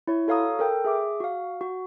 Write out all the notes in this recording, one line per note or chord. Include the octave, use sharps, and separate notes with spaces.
E4 C#5
F#4 A4 C#5 F5 A#5 D#6
A4 A#4 G5
G#4 E5 D6
F#4 F5
F#4